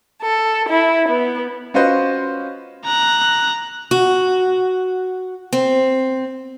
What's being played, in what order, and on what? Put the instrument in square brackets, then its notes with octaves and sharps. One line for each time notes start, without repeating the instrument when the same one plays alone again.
[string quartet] A4
E4
B3
[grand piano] C#4 F4 F#4 B4 C5 D#5
[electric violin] A#5 F#6
[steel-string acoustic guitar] F#4
C4